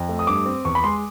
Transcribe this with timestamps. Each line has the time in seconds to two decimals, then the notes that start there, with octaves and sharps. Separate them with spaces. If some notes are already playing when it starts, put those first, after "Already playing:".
Already playing: F2
0.09 A3
0.19 D#6
0.27 G2 D6
0.46 C4
0.65 E2 C#6
0.75 B5
0.83 G#3 C6